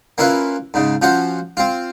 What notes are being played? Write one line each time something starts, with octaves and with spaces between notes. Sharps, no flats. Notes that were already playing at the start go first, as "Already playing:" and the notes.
A#3 C#4 E4 F4 B4
G#2 C#3
F3 C#4 F#4 C5
C4 F4